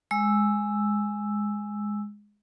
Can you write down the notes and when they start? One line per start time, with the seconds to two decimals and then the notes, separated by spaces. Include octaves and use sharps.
0.11 G#3 E6